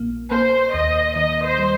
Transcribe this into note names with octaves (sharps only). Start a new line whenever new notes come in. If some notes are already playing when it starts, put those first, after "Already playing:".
Already playing: A#1 A#2 A#3
A#3 C5
D#2 D#5
D#3 D#5
C5
G3